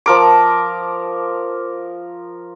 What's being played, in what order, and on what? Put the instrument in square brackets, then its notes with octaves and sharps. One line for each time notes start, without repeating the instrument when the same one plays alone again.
[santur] F3 A#4 D6